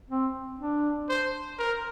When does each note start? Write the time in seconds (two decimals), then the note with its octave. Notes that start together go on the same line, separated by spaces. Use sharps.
0.10 C4
0.60 D4
1.09 C5
1.59 A#4